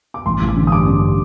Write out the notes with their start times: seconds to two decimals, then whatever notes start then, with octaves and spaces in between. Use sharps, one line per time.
0.14 D6
0.26 A1 C6
0.41 A1
0.48 D6
0.56 D3
0.67 D#6
0.72 G2 D6
0.87 D3